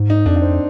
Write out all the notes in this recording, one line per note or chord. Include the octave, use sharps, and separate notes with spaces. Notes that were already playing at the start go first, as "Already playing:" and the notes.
Already playing: G#2
D#4
F2 D4
D4
C4